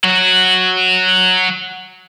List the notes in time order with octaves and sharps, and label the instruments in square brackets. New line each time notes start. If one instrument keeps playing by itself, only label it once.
[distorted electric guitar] F#3 F#4